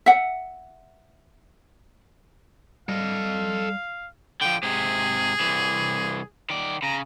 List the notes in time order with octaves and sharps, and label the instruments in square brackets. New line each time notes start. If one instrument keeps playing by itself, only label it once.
[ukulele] E5 F#5
[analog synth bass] G3 [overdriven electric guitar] A4 D#5 [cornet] F5
[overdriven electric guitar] D3 F3 [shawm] G5
[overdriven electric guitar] G#2 C3 [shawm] G#4
[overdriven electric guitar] C2 E3
D#3 D5
[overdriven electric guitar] C#3 [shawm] A#5